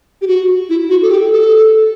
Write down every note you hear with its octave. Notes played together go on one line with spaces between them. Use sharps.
G4
F#4
E4
F#4
A4
G4
A4